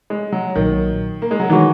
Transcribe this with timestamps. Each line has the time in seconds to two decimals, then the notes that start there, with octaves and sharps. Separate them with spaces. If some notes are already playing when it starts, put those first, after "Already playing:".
0.10 G#3
0.32 F#3
0.55 B1 A#2 D#3 F#3
1.22 A#3
1.31 G#3
1.40 F#3
1.50 D#3 E3 G#3 D#4 F#4